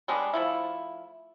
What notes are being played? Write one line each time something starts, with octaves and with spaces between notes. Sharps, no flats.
G3 G#3 B3 D4
F3 A3 E4